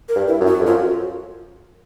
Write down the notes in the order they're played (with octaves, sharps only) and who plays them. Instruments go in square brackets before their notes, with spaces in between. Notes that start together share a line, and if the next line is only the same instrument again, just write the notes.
[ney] A#4
[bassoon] G2
[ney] E4
[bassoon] F#2
[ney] F#4
[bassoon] F2
[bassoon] F#2 [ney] F4